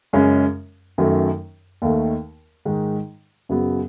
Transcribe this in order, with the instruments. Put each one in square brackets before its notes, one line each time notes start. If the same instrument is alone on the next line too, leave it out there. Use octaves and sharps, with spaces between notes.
[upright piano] F#2 C#3 G#3 C#4
F#2 D#3 F#3 A3
D#2 D#3 A3
G#2 D#3 G#3
F#2 C#3 F#3 B3